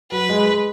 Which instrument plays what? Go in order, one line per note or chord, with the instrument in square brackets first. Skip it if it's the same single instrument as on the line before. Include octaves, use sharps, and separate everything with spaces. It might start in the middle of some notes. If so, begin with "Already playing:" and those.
[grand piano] F#3 [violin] B4
[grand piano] G#3
G#3